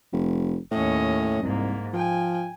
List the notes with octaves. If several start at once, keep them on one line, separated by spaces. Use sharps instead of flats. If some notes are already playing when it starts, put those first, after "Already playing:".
F1
D#2 A2 C#4 D#5
C2 G#2 A#3
F3 G5 G#5